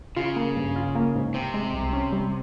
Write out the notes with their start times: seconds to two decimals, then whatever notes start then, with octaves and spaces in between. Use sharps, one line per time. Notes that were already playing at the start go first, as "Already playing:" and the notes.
0.16 C#3 F4
0.36 A#3
0.56 G2
0.76 F4
0.95 A#3
1.15 G#2
1.34 C3 C4
1.54 G#3
1.74 C2
1.93 C#4
2.12 G3